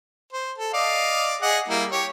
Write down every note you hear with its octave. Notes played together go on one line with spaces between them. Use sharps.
C5
A4
D5 D#5 F5
G#4 D#5 F#5
G3 A#3 E4
G4 C#5